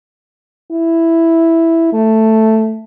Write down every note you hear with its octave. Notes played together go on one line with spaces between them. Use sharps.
E4
A3